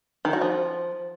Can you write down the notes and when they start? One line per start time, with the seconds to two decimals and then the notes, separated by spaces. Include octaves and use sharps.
0.25 D#3
0.33 F#4
0.41 F3